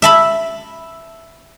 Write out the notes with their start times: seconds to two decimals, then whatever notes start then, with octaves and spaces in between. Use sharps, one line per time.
0.02 E5 A5 B5